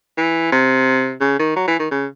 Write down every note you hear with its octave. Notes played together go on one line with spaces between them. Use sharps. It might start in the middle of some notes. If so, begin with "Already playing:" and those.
E3
C3
C#3
D#3
F#3
E3
D#3
C#3